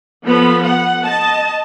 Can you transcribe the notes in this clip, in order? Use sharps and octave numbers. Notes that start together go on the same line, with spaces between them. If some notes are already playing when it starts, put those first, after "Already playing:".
F3 B3 A4 B5
F#5
D#5 A5